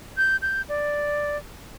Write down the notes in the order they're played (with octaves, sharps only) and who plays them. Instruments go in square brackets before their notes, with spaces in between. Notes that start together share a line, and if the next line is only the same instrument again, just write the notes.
[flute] G6
G6
D5